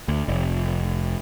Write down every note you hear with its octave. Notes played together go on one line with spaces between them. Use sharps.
D2
F1